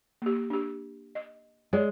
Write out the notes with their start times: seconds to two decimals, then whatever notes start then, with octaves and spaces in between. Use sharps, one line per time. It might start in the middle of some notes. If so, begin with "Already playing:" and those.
0.22 A#3 G4
0.50 D4 G4
1.15 D#5
1.73 G#3 C#5 D5